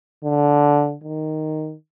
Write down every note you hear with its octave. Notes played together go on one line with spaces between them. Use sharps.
D3
D#3